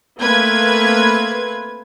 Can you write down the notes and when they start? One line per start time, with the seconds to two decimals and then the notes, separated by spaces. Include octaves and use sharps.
0.21 A3 A#3 C4 B4 G#6